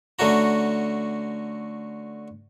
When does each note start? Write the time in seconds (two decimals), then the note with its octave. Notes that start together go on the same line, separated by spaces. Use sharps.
0.19 D3 A3 C#4 F#4 A#5